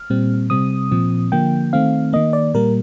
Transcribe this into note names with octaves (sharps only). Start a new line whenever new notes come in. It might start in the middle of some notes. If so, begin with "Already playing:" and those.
Already playing: F6
A#2 G3 C4
C3 G3 C4 D#6
A#2 F3 C4
D3 F3 A#3 G5
D#3 A3 C4 F5
D#3 A#3 D#5
D5
A#2 G3 A#3 A#4